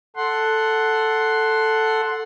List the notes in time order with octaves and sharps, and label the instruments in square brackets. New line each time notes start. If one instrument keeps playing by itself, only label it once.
[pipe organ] A4 F#5 C6